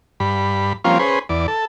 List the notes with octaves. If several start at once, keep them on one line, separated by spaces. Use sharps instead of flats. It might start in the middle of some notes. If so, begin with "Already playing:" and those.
G2 B5
F3 G3 A#3 C4 C#4 F4
C#4 G#4 B4 C5
E2 D5
A4